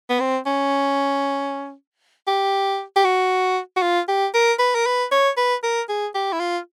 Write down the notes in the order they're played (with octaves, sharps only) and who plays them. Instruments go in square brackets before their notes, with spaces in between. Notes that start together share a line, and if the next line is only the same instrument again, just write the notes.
[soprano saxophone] B3
C4
C#4
G4
G4
F#4
F#4
F4
G4
A#4
B4
A#4
B4
C#5
B4
A#4
G#4
G4
E4
F4